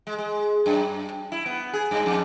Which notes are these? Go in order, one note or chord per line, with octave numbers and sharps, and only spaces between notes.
G#3
G#3
F#2
E4
B3
G#4
G2
F2